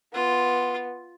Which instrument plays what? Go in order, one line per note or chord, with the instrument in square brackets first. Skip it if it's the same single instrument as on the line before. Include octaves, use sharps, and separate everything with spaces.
[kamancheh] B3 [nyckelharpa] F4